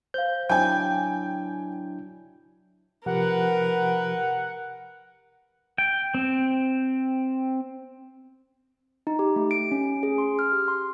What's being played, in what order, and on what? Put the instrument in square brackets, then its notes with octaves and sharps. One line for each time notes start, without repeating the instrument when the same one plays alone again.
[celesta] C5 F5 [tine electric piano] G6
[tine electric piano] F#3 D4 E4 [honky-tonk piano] G5 G#5 [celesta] G6
[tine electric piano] C3 F3 G4 [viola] A#4 B4 [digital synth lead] F#5
[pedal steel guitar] G5
C4
[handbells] D#4
G4
A3
D7
C#4
G#4
C6
F6
G4
C6